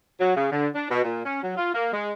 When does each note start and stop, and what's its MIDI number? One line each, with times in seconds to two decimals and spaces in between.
0.20 0.34 54
0.36 0.49 49
0.51 0.67 50
0.75 0.88 62
0.91 1.01 47
1.04 1.24 46
1.25 1.41 61
1.43 1.54 54
1.57 1.73 65
1.74 1.92 58
1.93 2.12 56